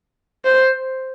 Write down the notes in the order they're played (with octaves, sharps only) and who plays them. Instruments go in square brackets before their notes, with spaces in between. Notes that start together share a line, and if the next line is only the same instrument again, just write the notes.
[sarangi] C5